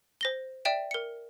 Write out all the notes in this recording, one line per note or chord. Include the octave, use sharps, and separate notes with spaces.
C5 A#6 G7
D5 E5 G5 E7
A#4 C#7